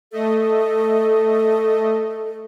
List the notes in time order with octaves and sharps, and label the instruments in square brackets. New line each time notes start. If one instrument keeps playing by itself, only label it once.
[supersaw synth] A3 D#5 [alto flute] A4